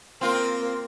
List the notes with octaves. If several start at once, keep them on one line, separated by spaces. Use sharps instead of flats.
A#3 C4 F4